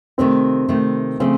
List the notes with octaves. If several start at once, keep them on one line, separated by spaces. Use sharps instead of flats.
C3 D#3 A3 C4
C3 D#3 A3
C#3 F3 A3 C4